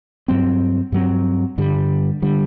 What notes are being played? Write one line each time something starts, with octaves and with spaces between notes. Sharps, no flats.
G2 F#3 C4
G2 F#3 C4
G2 D3 G3
D3 G3